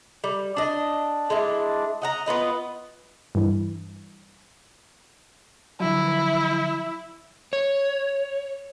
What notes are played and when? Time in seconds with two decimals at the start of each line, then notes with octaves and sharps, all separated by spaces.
0.24 G3
0.56 D4 D#5
1.30 G#3 D4 E4
2.02 D#5 F#5 A#5
2.26 B3 F4 B4 D#5
3.35 G2 E3
5.80 D3 F3 F#3 E4
7.53 C#5